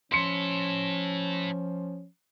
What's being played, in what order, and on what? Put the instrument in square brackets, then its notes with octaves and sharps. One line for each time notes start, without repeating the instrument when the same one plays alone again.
[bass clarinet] F3 [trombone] C#4 [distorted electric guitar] E4 A4 [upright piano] C6 C#7